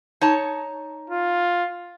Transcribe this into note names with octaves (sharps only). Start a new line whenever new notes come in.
D#4 C#5 A5
F4